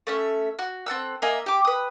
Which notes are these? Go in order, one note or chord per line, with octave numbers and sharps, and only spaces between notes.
A3 C#4 E5
F#4
C4 A4 F#5 E6
A#3 D#5 E5 G#5
G4 D6
B4 D#6